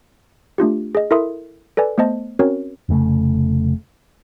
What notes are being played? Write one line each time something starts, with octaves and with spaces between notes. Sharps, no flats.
A3 D4 F4 G4
G#4 D#5
E4 A4 A#4 E5 C6 D#6
A4 B4 D5 G#5
A3 B3 C5 D#5 A5
C4 C#4 F#4 A#4 C#5
F1 C#3 A3